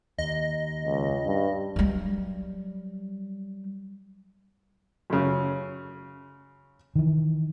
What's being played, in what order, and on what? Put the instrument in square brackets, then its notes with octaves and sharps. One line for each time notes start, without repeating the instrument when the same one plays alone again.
[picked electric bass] D#2 [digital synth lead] D#5
[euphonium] C#2
G2
[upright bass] F#3 G3
[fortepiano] F#2 C#3
[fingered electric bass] D#3 E3